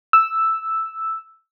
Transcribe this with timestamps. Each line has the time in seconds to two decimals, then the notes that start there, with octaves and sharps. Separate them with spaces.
0.13 E6